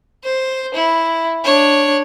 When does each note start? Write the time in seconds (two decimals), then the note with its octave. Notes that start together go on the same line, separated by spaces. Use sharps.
0.24 C5
0.74 E4
1.44 D4 C#5